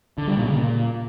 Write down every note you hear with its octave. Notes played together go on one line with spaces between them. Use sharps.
D3
G3
A#2
C#3
A#2